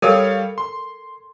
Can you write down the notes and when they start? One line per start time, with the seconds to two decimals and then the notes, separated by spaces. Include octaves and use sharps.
0.02 G3 A4 A#4 C#5 F5
0.58 C6